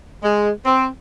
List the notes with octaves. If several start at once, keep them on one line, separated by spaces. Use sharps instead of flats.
G#3
C4